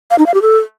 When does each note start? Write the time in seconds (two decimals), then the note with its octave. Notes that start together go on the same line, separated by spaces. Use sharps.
0.11 F5
0.18 D#4
0.26 F5
0.34 G4
0.42 A4